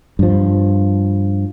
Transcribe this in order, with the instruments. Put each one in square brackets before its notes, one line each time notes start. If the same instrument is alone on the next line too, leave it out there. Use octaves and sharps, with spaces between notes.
[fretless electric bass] G2 F3